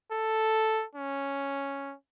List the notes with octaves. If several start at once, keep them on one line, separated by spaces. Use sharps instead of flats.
A4
C#4